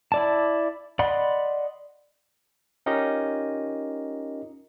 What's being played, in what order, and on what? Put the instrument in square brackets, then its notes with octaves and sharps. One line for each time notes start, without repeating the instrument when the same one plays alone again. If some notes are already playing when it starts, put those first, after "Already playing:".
[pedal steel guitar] E4 D5 A5
D5 D#5 F#5 B5 C6
[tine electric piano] C#4 D#4 F4 G4 A#4 D#5